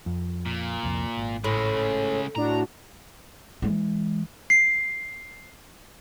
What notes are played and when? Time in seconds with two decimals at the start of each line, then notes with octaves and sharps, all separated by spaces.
0.06 F2
0.46 A#2
0.83 C2 F2
1.17 G#1
1.44 A2 C#3 G#3
2.36 A2 D4 F#4 A#5
3.62 E3 G#3
4.50 C7